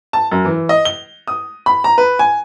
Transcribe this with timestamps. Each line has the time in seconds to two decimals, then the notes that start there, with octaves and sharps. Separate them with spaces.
0.13 A5
0.32 F#2
0.45 E3
0.69 D#5
0.85 G7
1.27 D#6
1.66 B5
1.84 A#5
1.98 B4
2.19 G#5